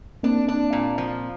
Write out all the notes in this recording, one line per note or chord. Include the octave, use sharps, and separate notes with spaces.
A#3 C4 D4
D4
A#2
F3